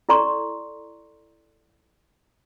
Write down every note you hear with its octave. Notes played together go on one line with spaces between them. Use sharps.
E4 A4 D5 A#5 C6 C#6